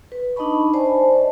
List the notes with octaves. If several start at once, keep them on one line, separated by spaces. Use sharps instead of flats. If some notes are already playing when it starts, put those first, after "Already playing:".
B4
D4 D#4 D#5 A5 B5 C#6
C5 D5 D#5 G#5 A5